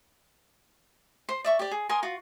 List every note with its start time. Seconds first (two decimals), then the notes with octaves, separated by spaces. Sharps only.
1.29 C5 C6
1.44 D5 E5 C#6
1.59 G4 D5
1.71 G#4
1.89 A#4 G#5 C6 D#6
2.03 F4 F#4